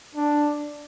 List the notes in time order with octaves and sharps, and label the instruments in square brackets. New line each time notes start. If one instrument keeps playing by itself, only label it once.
[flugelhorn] D4